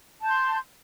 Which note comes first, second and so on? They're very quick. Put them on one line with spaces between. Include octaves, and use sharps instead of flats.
A5 G6 C6